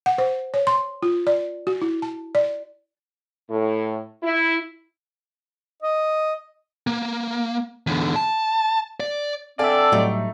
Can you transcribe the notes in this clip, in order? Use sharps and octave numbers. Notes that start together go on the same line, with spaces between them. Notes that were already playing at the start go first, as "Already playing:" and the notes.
F#5
C5
C#5
C6
F4
D5
F#4
E4
A5
D5
A2
E4
D#5
A#3
E2 D3
A5
D5
D3 C4 A4 D5 E5 F5 G#5 A5
A2 F#3 G3 A3 D#4